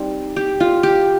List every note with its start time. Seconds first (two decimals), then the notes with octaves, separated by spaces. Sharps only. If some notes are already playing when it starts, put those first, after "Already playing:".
Already playing: G3 C4 D#4
0.36 G4
0.60 F4
0.83 G4